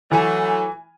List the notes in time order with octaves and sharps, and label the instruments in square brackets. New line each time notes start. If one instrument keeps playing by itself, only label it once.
[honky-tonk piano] E3 G#5 [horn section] F#3 A3